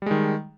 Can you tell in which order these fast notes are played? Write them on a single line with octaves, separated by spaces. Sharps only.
G3 G#3 D#3